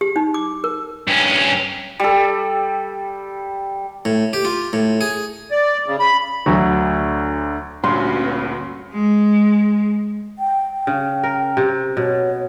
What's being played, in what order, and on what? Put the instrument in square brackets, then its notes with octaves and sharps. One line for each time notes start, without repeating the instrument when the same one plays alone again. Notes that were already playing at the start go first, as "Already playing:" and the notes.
[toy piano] G4
D#4
D6
A#4
[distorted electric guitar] G2 C#4
[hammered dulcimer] G3 A4
[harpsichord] A2
G4
F4
A2
G#4
[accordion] D5
C#3
B5
[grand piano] D2 F#3
[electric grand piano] D2 G2 A#2 [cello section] C#4 F#4 B4 [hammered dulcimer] C6
[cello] G#3
[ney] G5
G5
[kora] C#3
A#4
C3
[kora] B2 [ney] C#5